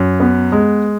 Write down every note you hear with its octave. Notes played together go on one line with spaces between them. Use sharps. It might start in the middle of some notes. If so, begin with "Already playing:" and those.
Already playing: F#2
B3
G#3